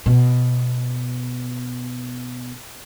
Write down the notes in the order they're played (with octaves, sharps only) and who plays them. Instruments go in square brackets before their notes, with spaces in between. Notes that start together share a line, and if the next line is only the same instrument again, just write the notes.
[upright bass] B2